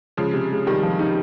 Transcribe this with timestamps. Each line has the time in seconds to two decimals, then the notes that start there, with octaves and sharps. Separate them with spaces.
0.17 C#3 F3 G#3
0.33 C3
0.50 G#3
0.66 C3 D#3 G3
0.83 F3
0.99 D#4